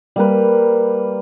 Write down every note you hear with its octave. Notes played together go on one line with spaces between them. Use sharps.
G3 A#3 B4